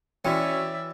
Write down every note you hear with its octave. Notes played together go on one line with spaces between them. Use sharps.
E3 C#4 F#4 D5 E5 G5